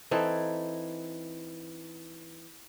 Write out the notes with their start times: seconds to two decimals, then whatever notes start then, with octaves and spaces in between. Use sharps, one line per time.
0.11 E3 C4 D#4 A4